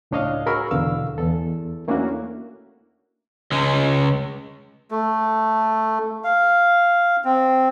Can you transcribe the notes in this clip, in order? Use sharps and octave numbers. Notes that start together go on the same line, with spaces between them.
C#2 A2 D4 C#5 D#5 F5
F#4 G#4 A#4 B5 C#6 E6
E2 B2 D3 F5 E6
E2 A4
A3 A#3 C#4 D4 E4 F#4
C#2 G#3
A3
F5
C4